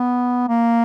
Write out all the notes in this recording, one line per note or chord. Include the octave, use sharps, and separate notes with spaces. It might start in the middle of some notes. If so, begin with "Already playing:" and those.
Already playing: B3
A#3